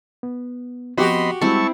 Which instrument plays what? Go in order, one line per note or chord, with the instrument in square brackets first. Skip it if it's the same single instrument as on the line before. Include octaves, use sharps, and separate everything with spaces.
[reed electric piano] B3
[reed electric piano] F3 B3 C4 [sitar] F#4 G4 [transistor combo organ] D#5 B5 C6
[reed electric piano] G3 G#3 [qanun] C4 E4 [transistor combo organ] A5 C#6